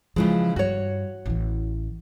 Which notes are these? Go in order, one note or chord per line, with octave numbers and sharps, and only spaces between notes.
C#3 E3 F3 G#3
G2 F#4 C#5
A1 E3